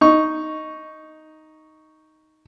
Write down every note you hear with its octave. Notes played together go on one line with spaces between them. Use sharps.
D#4 C#6